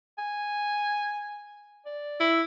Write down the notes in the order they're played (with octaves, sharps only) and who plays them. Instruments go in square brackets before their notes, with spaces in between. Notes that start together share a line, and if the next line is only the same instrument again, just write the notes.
[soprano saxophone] G#5
D5
[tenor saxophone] E4